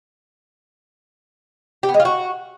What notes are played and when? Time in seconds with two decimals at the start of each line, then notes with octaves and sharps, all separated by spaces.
1.83 G4
1.89 B3
1.94 G#3
2.00 F4
2.05 F#4